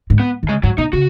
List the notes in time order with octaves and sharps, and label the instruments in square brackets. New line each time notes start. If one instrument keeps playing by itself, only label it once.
[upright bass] G#2
[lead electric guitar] B3
[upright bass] D#3
[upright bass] C#3 [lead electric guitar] G#3
[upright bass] G#2 [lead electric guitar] F#3
[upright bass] B2 [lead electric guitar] D#4
[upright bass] C#3 [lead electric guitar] F#4